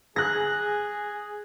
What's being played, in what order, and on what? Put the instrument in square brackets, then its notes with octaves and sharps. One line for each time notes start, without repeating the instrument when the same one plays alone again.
[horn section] G#4 [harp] F#6 A#6